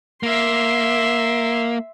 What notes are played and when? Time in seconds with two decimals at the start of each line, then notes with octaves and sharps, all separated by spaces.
0.23 A#3 E5 C6